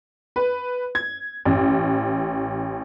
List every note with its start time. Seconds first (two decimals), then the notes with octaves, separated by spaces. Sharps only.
0.36 B4
0.95 G#6
1.45 A1